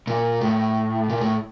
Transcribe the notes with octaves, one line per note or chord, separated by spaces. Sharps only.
A#2
A2
A#2
A2